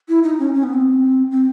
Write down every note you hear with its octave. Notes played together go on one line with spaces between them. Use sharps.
E4
D#4
C#4
C#4
B3
C4
C4